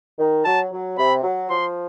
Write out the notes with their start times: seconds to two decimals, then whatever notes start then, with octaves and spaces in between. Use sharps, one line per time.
0.19 D#3
0.45 F#3 A5
0.72 F#3
0.98 C3 B5
1.24 F#3
1.50 F3 C6